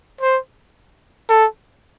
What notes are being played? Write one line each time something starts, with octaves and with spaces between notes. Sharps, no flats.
C5
A4